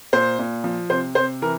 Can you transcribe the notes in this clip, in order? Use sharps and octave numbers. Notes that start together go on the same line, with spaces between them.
A#2 C5
A#2
F3
C3 C5
C3 C5
E3 A#4